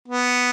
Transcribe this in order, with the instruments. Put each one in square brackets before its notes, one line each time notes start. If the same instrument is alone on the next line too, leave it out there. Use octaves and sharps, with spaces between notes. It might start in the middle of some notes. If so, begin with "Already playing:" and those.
[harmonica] B3